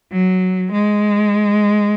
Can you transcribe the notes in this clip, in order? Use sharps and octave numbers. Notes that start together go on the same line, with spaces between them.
F#3
G#3